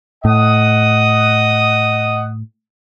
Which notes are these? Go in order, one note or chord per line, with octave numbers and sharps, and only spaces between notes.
A2 D#5 F#5 D#6